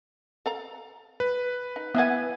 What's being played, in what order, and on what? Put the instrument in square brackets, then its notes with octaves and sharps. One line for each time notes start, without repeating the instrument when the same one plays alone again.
[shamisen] A4 F5 A#5
[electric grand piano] B4
[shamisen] D#4
[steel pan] B3 E5 G#5 [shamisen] E4 F#5